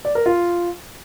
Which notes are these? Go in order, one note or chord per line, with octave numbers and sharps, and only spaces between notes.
D5
A#4
F4